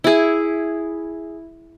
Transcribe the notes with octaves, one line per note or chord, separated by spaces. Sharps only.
E4 G#4